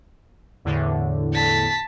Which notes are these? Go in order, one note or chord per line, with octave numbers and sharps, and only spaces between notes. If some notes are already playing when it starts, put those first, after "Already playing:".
E2 A2 D3
A5 B6